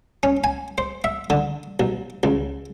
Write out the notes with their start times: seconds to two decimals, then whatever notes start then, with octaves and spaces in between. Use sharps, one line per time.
0.23 C#4
0.44 G#5
0.78 C5
1.04 E5
1.30 D3
1.80 B1
2.23 C#2